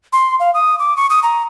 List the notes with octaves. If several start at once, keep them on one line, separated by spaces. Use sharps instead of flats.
C6
F5
D#6
D6
C#6
D#6
A#5